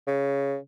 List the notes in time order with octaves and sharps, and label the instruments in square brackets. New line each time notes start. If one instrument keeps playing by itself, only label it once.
[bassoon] C#3